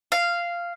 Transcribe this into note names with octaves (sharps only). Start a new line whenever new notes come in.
F5